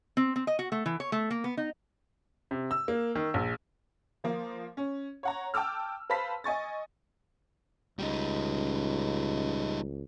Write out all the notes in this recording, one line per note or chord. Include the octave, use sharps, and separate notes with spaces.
C4
C4
D#5
F#4
A3
E3
C#5
A3
A#3
B3
D#4
C3
E6
A#3
D#3
A#1
F3 A#3
C#4
C#5 F#5 A#5
G5 A5 D6 E6 F6
B4 C5 F5 A5 B5 B6
D#5 G#5 C#6 A6
C#2 G3 D#4